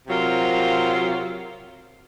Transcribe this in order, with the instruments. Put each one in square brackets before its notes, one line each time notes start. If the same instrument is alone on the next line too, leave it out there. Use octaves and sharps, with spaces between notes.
[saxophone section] C3 F#3 C4 F4 A#4